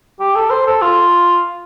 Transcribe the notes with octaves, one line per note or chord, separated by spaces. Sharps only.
G4
A4
C5
A4
F4